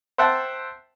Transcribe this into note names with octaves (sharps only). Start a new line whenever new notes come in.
C5 E5 F#5 G5 A5